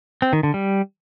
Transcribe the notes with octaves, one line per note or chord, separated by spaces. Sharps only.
C4
D#3
D3
G3